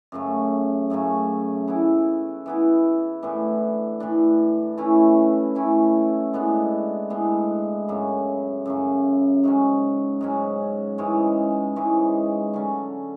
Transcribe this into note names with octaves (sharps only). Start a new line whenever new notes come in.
F#2 C#3 F#3 A3
F#2 C#3 F#3 A3
E3 B3 E4
E3 B3 E4
A2 E3 B3 D4
A2 E3 B3 D4
E3 A3 C#4 E4
E3 A3 C#4 E4
A2 G#3 B3 D4
A2 G#3 B3 D4
F#2 C#3 F#3
F#2 C#3 F#3
G#2 F#3 C#4
G#2 F#3 C#4
G#2 E3 G#3 C#4
G#2 E3 G#3 C#4
D3 F#3 C#4